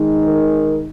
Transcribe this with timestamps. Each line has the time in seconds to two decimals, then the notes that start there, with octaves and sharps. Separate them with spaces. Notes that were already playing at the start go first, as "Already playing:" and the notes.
Already playing: D#3 G#3 D#4
0.23 A#4